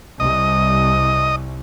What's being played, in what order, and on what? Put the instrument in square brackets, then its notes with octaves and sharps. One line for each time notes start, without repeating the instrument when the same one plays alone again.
[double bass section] C2 [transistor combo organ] D#5